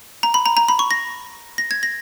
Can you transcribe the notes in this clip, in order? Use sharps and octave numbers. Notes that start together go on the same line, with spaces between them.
A#5
B5
A#5
A#5
B5
C#6
A#6
A#6
G#6
A#6